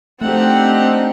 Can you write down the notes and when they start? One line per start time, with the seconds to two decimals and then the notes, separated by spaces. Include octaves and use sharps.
0.22 F3 A3 C4 D4 D#4 G4 F#5